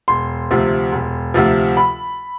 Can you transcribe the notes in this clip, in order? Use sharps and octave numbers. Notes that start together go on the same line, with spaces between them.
E1 C6
D2 C3 F3
E1
D2 C3 F3
B5